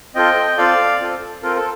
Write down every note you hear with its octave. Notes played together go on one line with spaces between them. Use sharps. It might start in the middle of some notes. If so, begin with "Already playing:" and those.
C4 F4 A4 D#5 G5
G5
C4 F4 A4 D5 F5
C4 F4 A4
C4 F4 A4 A#4
A4